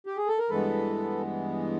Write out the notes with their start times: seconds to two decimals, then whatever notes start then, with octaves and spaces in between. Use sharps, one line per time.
0.06 G4
0.17 G#4
0.28 A4
0.39 A#4
0.49 G2 E3 G#3 B3 A4 B4